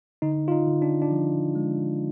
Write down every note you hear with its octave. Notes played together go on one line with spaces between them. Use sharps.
D3 D#4
F4
D#4
D3
D4
D4
F3
G#3